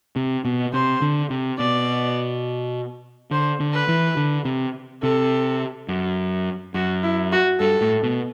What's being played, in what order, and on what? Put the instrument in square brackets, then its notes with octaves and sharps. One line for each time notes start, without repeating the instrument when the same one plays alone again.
[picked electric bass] C3
B2
[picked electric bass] C3 [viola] C5
[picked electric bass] D3
C3
[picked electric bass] B2 [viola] D5
[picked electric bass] D3 [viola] C5
[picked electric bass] D3
[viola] B4
[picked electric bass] E3
D3
C3
[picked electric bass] C3 [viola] A4
[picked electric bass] F#2
[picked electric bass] F#2 [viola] F#4
[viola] E4
F#4
[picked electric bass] G2 [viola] A4
[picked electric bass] A2
B2